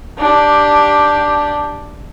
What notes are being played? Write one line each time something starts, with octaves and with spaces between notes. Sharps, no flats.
D4 G4